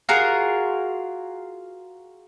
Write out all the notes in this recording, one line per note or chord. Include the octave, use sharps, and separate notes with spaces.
F4 F#4 G#4 A#4